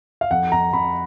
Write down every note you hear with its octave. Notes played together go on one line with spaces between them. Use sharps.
F5
F2 F#5
F2 A#5
F2 B5